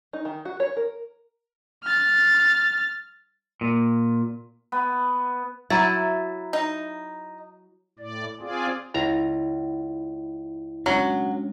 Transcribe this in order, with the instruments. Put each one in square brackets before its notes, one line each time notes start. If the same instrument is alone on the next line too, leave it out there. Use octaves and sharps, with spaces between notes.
[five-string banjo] D#4
D#3
F#4
C#5
A#4
[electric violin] F6 A6
[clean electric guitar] A#2
[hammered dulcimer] B3
[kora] F#3 E4 [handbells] E5 A#5
[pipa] D#4
[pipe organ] A2 D5
C4 F4 G#4 D5
[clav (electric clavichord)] C#2 A#5 [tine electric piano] E4
[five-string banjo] F#3 [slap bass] G#3 C#4 D4